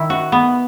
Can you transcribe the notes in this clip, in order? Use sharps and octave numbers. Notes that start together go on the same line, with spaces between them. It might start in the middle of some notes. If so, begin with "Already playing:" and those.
Already playing: D#3 E4
F#4
B3